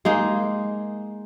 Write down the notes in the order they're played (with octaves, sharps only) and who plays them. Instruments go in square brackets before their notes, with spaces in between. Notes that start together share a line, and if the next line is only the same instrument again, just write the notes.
[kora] G#3 A#3 D#4